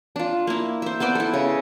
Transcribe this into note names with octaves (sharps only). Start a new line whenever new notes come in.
D4 F4
A#3 E4
C5 E5
B3 B4 C5 D5
E4 A4
C#3